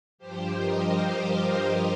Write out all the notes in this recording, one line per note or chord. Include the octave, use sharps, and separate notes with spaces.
G2 F3 G4 C5
A#4 D#5
C5 F5
A#4 D#5
G4 C5